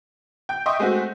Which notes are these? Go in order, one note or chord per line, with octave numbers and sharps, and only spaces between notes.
G5 G6
D#5 E5 G5 C6 C#6 D#6
G#3 A3 C4 F#4